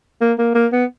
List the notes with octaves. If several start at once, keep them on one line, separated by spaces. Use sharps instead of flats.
A#3
A#3
A#3
B3